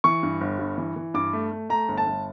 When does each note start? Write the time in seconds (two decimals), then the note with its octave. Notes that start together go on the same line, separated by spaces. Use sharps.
0.04 E3 C#6
0.23 G2
0.41 G1
0.59 G2
0.78 E3
0.96 E3
1.14 G2 D6
1.33 A3
1.52 A3
1.69 A3 A#5
1.88 G1
1.98 A5
2.07 G1